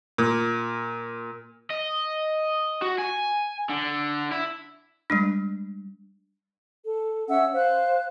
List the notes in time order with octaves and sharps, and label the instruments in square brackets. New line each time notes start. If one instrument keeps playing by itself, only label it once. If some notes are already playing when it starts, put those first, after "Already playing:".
[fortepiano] A#2
[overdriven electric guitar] D#5
F#4
G#5
D3
E4
[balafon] G3 G#3 D4
[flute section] A4
C#4 E5 F#5 E6
C5 F5 F#6